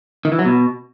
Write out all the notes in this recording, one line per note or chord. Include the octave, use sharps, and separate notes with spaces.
D#3
E3
F#3
B2